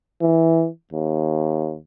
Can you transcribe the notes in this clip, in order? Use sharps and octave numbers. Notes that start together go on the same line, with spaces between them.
E3
D#2